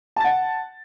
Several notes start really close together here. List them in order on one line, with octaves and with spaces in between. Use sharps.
A5 A6 F#5